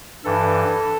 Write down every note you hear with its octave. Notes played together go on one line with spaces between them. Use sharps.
G2 E3 A4